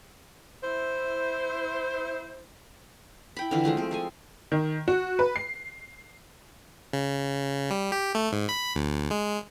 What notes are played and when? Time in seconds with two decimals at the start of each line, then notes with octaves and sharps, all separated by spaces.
0.62 E4 C5
3.36 E4 G5 B5
3.51 D3 E3 F4
3.64 F3 G#3 A3 F4
3.77 C4 A4
3.91 G#3 A4 G#5
4.52 D#3
4.88 F#4
5.19 B4
5.36 C7
6.93 C#3
7.71 G3
7.92 G4
8.15 A3
8.33 G#2
8.49 B5
8.76 D2
9.11 G#3